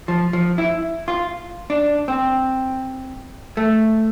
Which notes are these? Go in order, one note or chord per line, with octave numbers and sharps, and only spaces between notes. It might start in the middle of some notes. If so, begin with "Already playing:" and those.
F3
F3
E4
F4
D4
C4
A3